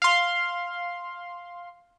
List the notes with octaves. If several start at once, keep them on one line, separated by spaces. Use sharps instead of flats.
F5 C6